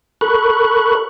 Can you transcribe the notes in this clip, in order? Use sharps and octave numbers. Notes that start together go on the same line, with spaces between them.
A4 A#4 B5 C#6 F#6